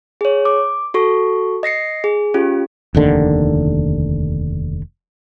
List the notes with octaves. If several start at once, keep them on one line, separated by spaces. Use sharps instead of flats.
G#4 C#5
D6
F#4 A4 C#6
D#5 A#6 C7 C#7
G#4
C#4 F4 G4
F1 D#2 D3 D#3